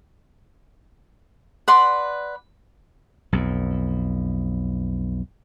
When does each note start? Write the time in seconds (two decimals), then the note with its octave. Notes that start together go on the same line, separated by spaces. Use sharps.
1.68 B4 D5 F#5 C6
3.33 B1 F2